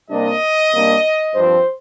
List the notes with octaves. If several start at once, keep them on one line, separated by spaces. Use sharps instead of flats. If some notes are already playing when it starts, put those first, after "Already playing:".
C3 G3 A#3 D4 D#5
C3 G3 A#3 D4
G2 F3 C4 C5